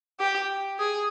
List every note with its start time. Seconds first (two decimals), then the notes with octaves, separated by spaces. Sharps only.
0.19 G4
0.79 G#4